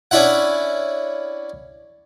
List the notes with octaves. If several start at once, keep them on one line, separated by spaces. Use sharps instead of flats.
C#4 D4 E4 E5 F#5